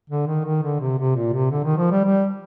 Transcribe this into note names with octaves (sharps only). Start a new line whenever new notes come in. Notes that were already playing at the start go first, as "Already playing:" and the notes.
D3
D#3
D#3
D3
C3
C3
A#2
C3
D3
D#3
F3
G3
G3